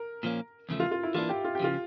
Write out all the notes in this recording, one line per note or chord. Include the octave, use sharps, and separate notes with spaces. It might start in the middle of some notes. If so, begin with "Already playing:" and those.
Already playing: A#4
A#2 F3 A#3 C#4
E2 C#3 F3 A3
F4
F4
E4
E3 A#3 D4 F4
G4
F4
G4
C#3 F3 F4